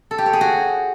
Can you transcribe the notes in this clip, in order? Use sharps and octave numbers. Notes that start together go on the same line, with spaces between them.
A4
G4
C#5
G#4
F#4